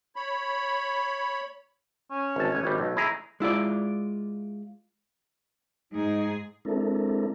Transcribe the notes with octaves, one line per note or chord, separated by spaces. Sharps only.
C#5 B5
C#4
G#1 A5
A1 G#5
G#1 G3
B1 A3
E4 G#4 A#5
G#3 E4 F4 D5
G#2 D#4 G#4
G#3 C4 D4 E4 A4 A#4